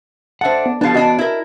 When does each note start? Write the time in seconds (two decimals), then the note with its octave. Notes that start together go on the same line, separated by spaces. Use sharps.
0.41 D4 A4 C5 E5 F#5
0.66 B3
0.81 F3 G3 B3 D4 A4 F5
0.94 E3 D4 F#4 D5 D#5
1.19 E4 A#4